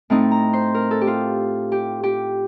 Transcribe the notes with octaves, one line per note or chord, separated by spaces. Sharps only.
A2 A3 C4 D#4
A#5
C5
A#4
A4
G4
F4
G4
G4